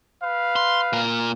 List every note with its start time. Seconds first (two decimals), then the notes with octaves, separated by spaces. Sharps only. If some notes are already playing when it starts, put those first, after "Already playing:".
0.23 B4 F5
0.56 C6
0.93 A#2 A#4